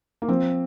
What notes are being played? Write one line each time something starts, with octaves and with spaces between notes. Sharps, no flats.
A#3
F3 C4